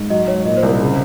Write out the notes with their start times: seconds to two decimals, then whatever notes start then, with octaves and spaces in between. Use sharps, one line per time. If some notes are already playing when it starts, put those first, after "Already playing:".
Already playing: G#2
0.10 F#3 D#5
0.27 G#2 C#5
0.45 A#2 D#5
0.57 C5
0.63 C2
0.69 A#4
0.80 C#3